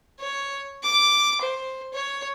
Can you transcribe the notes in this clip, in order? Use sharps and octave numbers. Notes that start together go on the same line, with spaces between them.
C#5
D6
C5
C#5